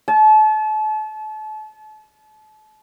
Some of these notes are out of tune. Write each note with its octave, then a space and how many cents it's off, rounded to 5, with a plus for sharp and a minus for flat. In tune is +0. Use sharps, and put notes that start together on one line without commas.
A5 -35